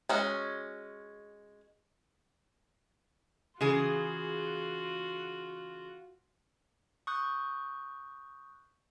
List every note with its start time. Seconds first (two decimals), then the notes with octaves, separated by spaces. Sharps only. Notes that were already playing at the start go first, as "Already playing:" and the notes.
0.09 G#3 C#4 F#4
3.61 C#3 E3 F4 F#4 G#4
7.07 C#6 D#6 F#6 G6